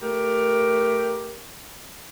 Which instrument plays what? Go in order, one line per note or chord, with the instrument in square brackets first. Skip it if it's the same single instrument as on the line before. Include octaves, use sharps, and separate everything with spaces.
[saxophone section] A3 G4 A#4